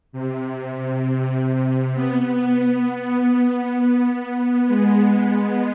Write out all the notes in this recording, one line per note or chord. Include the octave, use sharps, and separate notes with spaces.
C3
B3
B3
G#3